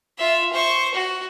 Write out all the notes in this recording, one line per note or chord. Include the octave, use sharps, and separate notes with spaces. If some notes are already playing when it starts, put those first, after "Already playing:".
F4 E5
C5 C#6
F#4